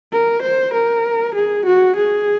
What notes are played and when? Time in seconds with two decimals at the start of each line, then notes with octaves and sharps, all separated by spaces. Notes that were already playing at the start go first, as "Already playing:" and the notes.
0.12 A#4
0.43 C5
0.74 A#4
1.35 G#4
1.65 F#4
1.96 G#4